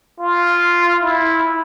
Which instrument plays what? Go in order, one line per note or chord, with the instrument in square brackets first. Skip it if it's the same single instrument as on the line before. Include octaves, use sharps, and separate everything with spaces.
[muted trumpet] F4
E4